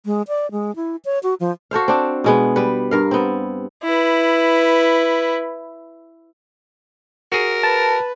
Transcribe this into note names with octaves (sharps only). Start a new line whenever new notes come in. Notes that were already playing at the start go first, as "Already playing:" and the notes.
G#3
D5
G#3
E4
C#5
F#4
F3
F#4 A4 C5 F5
C4 D4
B2 G#3 B3
G3 B4
G2 A#4 F5
B3 C4
E4 B4
F#4 G#4 A#4
B4 A5